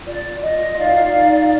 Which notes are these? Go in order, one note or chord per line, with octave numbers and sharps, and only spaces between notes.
F4 D5
F4 D#5
D#4 D5 F5
D#4